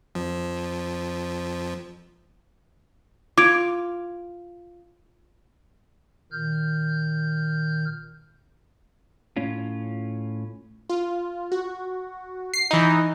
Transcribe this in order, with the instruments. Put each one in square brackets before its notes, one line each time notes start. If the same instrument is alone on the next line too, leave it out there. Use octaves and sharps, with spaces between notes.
[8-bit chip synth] F2 F3
[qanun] F4 [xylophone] D6 G#6 D7
[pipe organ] A#2 D#3 F6 G6
[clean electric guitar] A2 C#4 F4
[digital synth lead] F4
F#4
[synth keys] C7
E3 D#4